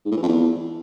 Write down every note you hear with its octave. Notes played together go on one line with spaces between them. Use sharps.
G#2
A2
E3
F2
E2